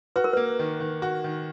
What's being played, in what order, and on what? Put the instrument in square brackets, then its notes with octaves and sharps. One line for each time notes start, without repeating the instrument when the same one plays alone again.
[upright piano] F#4 [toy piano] B4
[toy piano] A#4
[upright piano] A#3 [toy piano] B4
[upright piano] D#3
D#3
F#4
D#3